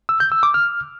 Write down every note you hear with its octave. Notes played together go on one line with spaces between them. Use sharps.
E6
G6
E6
D6
F6